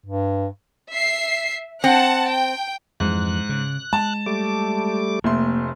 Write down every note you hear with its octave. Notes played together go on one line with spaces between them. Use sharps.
G2
E5 C7
C4 F#5 A5
G5
F2 G#2 E3 F#6
C#3
G#3 A5
G3 A3 D6
F1 A3 A#3 C6